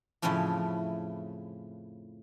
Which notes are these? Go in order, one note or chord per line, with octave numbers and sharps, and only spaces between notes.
F2 A2 C#3 F3 C#4 E4